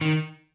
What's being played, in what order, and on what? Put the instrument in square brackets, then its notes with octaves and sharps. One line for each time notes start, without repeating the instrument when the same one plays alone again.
[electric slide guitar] D#3